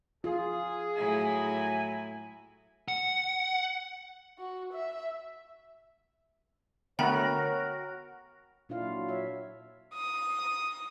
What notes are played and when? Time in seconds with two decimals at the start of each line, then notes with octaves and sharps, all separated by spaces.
0.24 F4 G#4
0.97 A2 F#3 E4 G#5
2.88 F#5
4.39 F#4
4.73 E5
6.99 D3 A3 B3 F#4 A#4 C#5 G5 B5
8.69 A#2 D4 E4 F4 F5
8.82 F#3 F#4
9.08 C#5 E5
9.94 D#6